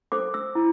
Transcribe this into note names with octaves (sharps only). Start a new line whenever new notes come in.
A4 C5 D6
E6
E4